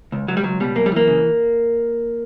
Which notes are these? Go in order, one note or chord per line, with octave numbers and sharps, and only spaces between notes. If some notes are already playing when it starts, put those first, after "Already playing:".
C#2
C#2 F#3
G3
C#2 F#3
B2 G3
F#2 A#3
G3
E3 A#3
C#3